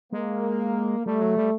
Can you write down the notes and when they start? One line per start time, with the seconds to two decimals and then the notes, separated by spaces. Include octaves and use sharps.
0.13 G#3 A#3
1.06 G3 A3
1.21 F#3
1.37 G3